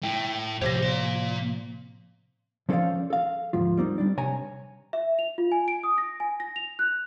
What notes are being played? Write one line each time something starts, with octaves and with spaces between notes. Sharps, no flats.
A2 G5
A2 C3 F3 G4 C5 C#5 A#6
A#3 C6
F3 C#4 A4 C5 D5 F5
A4 F5
D2 G#2 F3 F4
G3 A#3 C4 D#4
G3 D4 D5
C3 C#5 G#5 A#5
E5
F7
F4
G#5
D7
D#6
A#6
G#5
A#6
F7
F#6